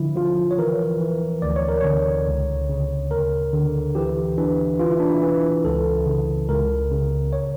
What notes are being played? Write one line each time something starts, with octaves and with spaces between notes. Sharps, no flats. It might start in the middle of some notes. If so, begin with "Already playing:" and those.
Already playing: D3 F3 E4
F3 F4
C#5
E3 A#4
E3
D2 D5
C#5
A#4
D3 C#5
C#2
C#3
D2 A#4
D3
E3 G4
E3 D4
E3 F4
E4
D4
E4
E3
C#2 A4
C#3
C#2 A#4
C#3
C#5